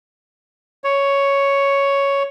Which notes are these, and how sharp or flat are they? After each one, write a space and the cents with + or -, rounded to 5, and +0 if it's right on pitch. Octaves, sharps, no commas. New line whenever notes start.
C#5 +5